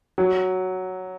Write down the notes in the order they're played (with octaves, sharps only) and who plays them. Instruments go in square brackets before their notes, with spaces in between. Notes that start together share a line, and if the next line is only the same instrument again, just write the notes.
[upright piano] F#3